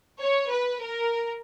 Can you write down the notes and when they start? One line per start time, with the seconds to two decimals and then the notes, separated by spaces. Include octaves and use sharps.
0.21 C#5
0.50 B4
0.81 A#4